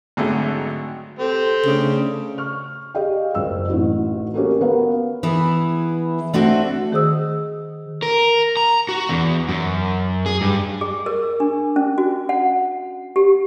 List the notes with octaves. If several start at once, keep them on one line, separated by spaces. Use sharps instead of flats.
G#1 D3 F#3 G#3 A3 A5
C4 G4 A4
C#3 A3 D4
C#6 F6
G4 G#4 D5 D#5 F5 G5
F#1 C#2 E6
A1 C4 D#4 E4 F#4
A#3 C#4 F#4 G4 A4 A#4
B3 A#4 B4 F5
E3 B3 E4 G#4
A3 C4 D4 F#4
D#3 G#4 C5 D#6 E6
A#4
A#5
F#4
E2
F#2
G#4
G2
G#4
A#4
D4
C#4
F#4
F#5
G4